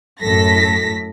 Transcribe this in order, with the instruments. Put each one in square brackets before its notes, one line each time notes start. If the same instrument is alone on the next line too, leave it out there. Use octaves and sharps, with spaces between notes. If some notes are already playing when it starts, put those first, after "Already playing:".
[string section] F#2 A2 A4 A#6 B6